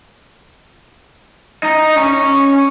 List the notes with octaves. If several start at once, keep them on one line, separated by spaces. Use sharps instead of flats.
D#4
C#4